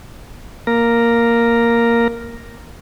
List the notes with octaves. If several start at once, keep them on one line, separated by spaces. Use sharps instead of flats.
A#3 A#4